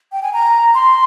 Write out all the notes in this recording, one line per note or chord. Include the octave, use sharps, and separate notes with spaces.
G5
G#5
A#5
C6